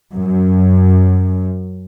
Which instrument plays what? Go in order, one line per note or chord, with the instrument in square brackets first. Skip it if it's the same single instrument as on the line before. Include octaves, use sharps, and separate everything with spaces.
[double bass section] F#2